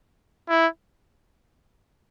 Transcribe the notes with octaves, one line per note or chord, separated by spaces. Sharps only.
E4